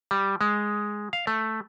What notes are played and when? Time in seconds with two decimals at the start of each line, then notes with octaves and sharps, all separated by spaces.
0.11 G3
0.41 G#3
1.13 F5
1.27 A3